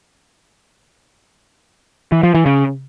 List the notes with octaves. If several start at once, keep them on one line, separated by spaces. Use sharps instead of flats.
E3
F3
E3
C#3